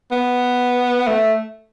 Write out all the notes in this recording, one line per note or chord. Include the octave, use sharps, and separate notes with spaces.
B3
A3